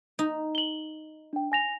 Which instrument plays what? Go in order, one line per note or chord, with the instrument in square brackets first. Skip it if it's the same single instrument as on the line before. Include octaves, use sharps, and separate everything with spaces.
[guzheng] D#4
[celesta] F#7 G7
D4 G5
G#5 A#6 F7